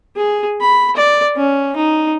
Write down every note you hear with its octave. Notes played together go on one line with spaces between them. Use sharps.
G#4
B5
D5
C#4
D#4